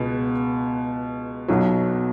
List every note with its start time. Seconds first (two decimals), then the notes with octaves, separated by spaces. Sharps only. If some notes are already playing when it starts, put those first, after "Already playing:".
Already playing: C#2 B2 G#3 B3
1.48 B1 B2 F#3